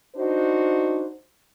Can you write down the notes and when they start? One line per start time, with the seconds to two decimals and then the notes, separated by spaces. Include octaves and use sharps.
0.16 D4 D#4 F#4 C5